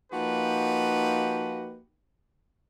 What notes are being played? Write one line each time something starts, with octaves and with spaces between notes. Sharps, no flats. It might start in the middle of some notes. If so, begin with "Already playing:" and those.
F3 A#3 D#4 F#4 G4 B4